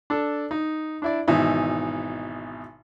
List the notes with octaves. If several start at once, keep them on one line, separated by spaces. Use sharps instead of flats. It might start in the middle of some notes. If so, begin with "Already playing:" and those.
D4 A4
D#4
D4 E4 D5
G#1 B2 E3 D#4 E5